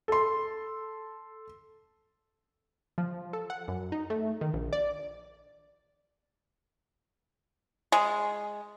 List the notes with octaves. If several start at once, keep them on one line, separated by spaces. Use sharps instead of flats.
A4 C6
F3
A4
F#5
F#2
D#4
A3
D#3
A#1
D5
G#3